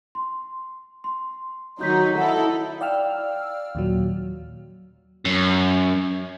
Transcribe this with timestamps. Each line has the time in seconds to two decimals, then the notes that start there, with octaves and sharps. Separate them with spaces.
0.15 C6
1.04 C6
1.81 D#3 F#3 D#4 G6 B6
2.17 D#4 E4 A4 F#5
2.81 D5 F5 G5 E6 F6
3.75 D#2 A#2 F#3
5.25 F#2